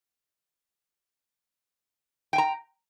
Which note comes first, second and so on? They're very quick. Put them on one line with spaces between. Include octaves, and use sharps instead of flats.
G5 G#5 A#5